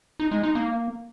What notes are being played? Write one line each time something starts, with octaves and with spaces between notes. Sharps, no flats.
D#4
G#3
D#4
A#3